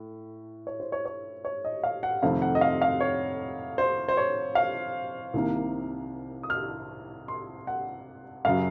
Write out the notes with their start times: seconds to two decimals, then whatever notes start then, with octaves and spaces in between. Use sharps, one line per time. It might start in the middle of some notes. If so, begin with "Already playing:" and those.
Already playing: A2
0.67 C#5
0.80 C5
0.92 C#5
1.06 C#5
1.45 C#5
1.65 D#5
1.84 F5
2.03 F#5
2.22 F2 C3 D#3 A3 C4 F5
2.42 F#5
2.55 D#5
2.61 F5
2.82 F5
3.01 C#5
3.78 C5
4.09 C5
4.17 C#5
4.55 F5
5.34 C2 C3 D#3 A#3
6.43 D#6
6.50 F6
7.28 C6
7.67 F#5
8.45 F#2 C#3 F#3 F5